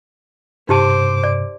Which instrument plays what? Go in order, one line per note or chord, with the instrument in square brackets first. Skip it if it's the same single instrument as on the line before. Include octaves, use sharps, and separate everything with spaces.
[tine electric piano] G2 C3 [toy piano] D#4 G4 A5 [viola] C5 D6
[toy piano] D5